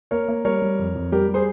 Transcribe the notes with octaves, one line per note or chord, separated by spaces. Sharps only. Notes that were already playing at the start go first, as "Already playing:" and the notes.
A#3 A#4 C#5
A#3
G3 A#4 C#5
G3
F2
F2
G3 G4 A#4
G3
G#4 C5